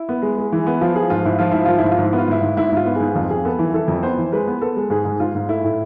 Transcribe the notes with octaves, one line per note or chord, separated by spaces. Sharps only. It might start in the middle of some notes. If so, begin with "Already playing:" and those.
Already playing: E4
B3
G#3
G#3
E3
B3
F3 F4
F3 G#4
G#2 F4
G#2 E4
F3 F4
G#2 E4
F3 F4
E4
G#2
F4
G#2
E4
B3
F4
G#2 E4
G#2
G#2 E4
G#2 F4
B3
G#2 G#4
F2 F4
F2 G#4
B3 A4
E3
E3 A4
F2
B3 C5
E3
G#3 B4
B3
B3 A4
G#3
G#2 G#4
G#2
G#2 F4
G#2
A3 E4
A2